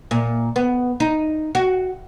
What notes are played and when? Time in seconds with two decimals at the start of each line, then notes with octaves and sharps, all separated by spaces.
0.11 A#2
0.56 B3
1.00 D#4
1.55 F#4